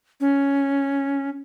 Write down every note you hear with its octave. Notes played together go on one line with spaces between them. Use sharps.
C#4